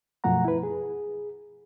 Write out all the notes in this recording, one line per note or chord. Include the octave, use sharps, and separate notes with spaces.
F#2 B2 F3 A3 F#5 A#5
E4 B4
G#4